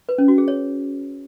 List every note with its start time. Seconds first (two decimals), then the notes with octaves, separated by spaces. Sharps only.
0.09 B4
0.18 C#4
0.28 F#4
0.38 G#4
0.48 C#5